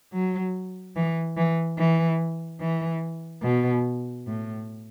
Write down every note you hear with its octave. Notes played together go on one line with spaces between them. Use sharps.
F#3
E3
E3
E3
E3
B2
A2